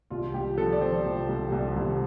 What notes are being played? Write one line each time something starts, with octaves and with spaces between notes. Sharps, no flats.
C2 F4
C2 G4
F3 A4
D5
F3 C5
C2
C2
C2
C2